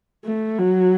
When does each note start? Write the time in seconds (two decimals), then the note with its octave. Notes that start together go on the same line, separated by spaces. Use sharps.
0.25 A3
0.59 F#3